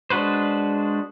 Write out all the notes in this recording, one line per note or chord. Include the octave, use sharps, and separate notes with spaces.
G#3 D4 F#4 B4 C5